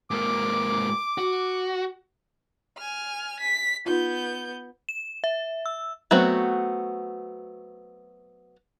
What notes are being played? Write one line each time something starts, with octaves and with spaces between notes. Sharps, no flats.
G#2 A#3 D6
F#4
G#5 F6
B6
B3 D#4 F4 G6
E7
E5
E6
F#3 A3 B3 C4 F#4